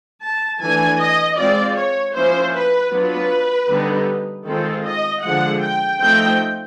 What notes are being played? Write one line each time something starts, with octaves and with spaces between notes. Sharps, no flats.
A5
E3 A3 D4 G#5
D#5
G#3 C4 F4 D5
C#5
F3 A#3 C#4 E4 C5
B4
F#3 B3 D4 F4 B4
D3 G3 B3 D#4
D#3 G#3 C4 F4 A4
D#5
D3 F3 G#3 F#5
G5
F3 A3 C4 D#4 G5